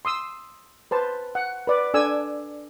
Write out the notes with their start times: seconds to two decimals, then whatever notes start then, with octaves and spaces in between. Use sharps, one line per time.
0.05 C6 D#6 E6
0.91 B4 C5 A5
1.35 F#5
1.67 B4 D5
1.94 D4 A4 D5 G#5 E6